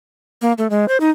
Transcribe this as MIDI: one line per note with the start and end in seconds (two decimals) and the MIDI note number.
0.42 0.53 58
0.58 0.67 57
0.70 0.85 56
0.88 0.97 72
1.00 1.10 63